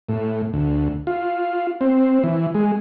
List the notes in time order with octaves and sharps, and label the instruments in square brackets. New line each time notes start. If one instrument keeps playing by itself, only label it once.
[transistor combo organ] A2
D2
F4
C4
E3
G#3